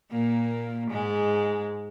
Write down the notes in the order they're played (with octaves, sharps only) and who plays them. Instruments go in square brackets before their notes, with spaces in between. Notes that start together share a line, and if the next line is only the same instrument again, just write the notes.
[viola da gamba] A#2 A#3
G#2 G#3